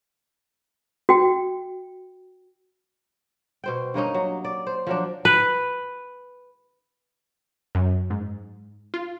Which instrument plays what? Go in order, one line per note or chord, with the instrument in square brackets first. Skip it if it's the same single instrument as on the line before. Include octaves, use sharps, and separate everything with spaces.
[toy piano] F#4 G5
[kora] B2 C5 G5
G2 A#3 C#4 D#4
F#3
D5
C5
F3 F#3 D4
B4
[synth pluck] F#2
G#2
F4